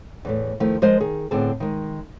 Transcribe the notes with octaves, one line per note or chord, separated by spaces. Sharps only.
E2 A2 A3
D#3 F3 A3 E4
F3 G#3 A#4 C5 D#5
D#3 G#4
A2 D3 B3 C4 G#4 A5
D#3 G#3